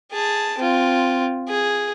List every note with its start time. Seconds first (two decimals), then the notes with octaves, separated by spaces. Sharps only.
0.12 G#4 A5
0.58 C4 F4
1.49 G#4